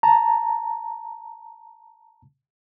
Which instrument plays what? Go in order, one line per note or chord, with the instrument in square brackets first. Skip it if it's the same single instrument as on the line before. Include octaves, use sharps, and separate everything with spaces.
[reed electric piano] A5 A#5